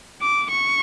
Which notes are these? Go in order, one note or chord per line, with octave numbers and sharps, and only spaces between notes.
D6
C#6